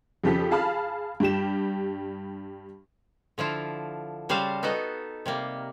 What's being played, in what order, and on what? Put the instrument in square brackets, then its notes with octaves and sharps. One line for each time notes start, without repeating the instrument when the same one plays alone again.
[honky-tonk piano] F2 C#3 F3 G4 A4 B6
G#4 F5 A5 B5 F6
G2 G3 G4 E7
[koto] D3 F3 E4 F4
C#3 G3 F#4 C5 F5 A5
B3 D#4 F#4 A4 D#5
C3 G3 A#3